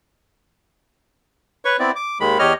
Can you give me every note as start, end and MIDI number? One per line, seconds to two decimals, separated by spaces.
1.65 1.77 71
1.65 1.77 73
1.65 1.77 85
1.79 1.91 59
1.79 1.91 60
1.79 1.91 64
1.79 1.91 74
1.96 2.18 86
2.20 2.38 39
2.20 2.38 51
2.20 2.38 56
2.20 2.38 83
2.39 2.53 40
2.39 2.53 67
2.39 2.53 73
2.39 2.53 75
2.39 2.53 89